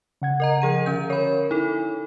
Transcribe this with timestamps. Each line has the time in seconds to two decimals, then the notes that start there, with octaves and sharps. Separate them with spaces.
0.22 C#3 F#5 G#6
0.40 A#4 D#5 A#5
0.62 F3 G#4 D#7
0.86 D3 C#4 G6
1.10 A#4 C#5 B5
1.51 D#4 E4 A4